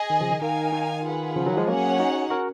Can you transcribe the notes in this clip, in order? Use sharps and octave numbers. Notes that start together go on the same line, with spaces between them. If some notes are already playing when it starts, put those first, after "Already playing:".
Already playing: G#4 D#5 G#5
D#3
C#3 F3
D#3
D#3 D#4 A#4 F5 G#5
D#3
F4 G#4 B4 F#5
C#3 F3
D#3 F#3
F3 G#3
F#3 A#3 C#4 G#4 C#5 F#5
D#4 F#4
F#4 A#4